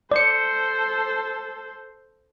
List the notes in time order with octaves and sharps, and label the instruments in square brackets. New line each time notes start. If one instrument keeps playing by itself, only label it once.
[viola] A4 C5 [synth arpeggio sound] D5 C#7